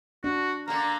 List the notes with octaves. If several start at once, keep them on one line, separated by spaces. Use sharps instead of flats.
D4 F#4
D3 A#3 A#5